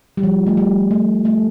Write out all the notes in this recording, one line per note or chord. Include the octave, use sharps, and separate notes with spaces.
G3
F3
A3
G3
A3
A3